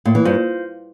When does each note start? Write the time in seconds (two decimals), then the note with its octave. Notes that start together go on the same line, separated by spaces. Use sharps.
0.05 A2 A#3
0.15 E3
0.25 G2 F4 C5 F5